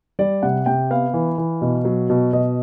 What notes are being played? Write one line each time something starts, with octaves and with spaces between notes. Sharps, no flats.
G3 D5
C3 F#5
C3 G5
B3 F5
E3
E3
B2
F#3
B2
B2 D#5